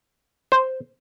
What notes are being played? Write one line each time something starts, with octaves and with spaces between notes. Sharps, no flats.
C5